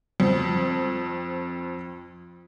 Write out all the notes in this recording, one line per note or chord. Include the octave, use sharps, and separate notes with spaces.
F2 C4